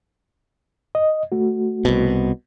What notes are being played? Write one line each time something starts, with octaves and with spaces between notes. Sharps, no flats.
D#5
A3 F#4
C2 B2